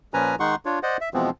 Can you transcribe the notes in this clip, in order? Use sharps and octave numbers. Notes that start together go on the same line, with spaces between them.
A#2 F3 C#4 B4 G#5 A#5
D#3 G#3 D#4 F#5 C6 C#6
D4 F4 C#5
C5 D5 D#5 F#5
E5
B2 E3 F3 G#3 B3 C4